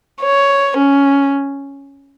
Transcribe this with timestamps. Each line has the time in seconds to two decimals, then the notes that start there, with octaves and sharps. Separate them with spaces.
0.21 C#5
0.78 C#4